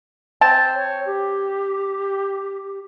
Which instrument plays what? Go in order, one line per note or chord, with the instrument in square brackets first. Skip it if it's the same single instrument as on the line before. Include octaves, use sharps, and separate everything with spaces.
[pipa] C4 A5
[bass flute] C#5
G4